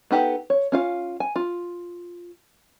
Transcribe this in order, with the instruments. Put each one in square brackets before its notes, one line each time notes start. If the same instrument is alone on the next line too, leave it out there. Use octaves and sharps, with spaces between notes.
[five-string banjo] B3 D#4 G4 A4 F#5
C#5
C#4 F4 F5
G#5
F4